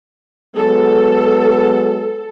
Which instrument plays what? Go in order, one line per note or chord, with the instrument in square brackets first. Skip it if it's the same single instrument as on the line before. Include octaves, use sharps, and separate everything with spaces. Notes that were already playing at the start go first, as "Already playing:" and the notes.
[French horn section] F#3 G#3 B3 [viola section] A4